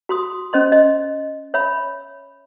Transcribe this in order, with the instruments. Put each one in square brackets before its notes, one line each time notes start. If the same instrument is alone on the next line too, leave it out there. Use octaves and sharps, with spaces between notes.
[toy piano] F#4 C6 D#6
C#4 C5 D#5 C6
D#5
C#5 E5 B5